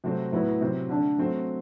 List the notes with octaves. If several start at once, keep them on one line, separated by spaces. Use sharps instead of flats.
C3 F#3 A3 C4
A2 F#3 B3 E4
C3 F#3 C4
D3 A3 D4
F#3 A3 C4